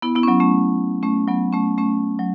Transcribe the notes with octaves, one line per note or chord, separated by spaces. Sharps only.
B3 E4
B3 E4
C#4
F#3 B3
A3 C#4
A3 C#4
F#3 B3
A3 C#4
A3 C#4
F#3